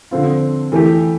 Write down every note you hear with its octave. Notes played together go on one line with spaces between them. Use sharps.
D3 F3 C4 F4
E3 A3 E4 G4